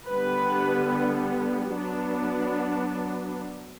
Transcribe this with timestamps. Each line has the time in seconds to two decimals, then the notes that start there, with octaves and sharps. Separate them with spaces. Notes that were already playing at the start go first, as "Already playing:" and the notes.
0.10 D3 G3 B3 B4
1.73 F#3 B3 D4